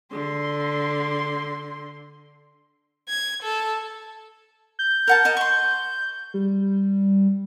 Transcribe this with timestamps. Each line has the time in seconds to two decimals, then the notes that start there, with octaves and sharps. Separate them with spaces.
0.12 D3 C6
3.09 G#6
3.42 A4
4.79 G6
5.07 A#4 F#5 A5
5.25 A#4 D#5 A5
5.37 C6 C#6
6.34 G3